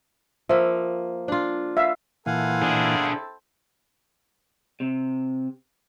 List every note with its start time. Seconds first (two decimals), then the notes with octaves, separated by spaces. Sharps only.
0.49 F3 A#3 E5
1.28 D4 F4
1.77 E5 F5
2.26 A#2 E3 C4 E4 A4 F5 F#5 G#5
2.62 D4 G#4
4.80 C3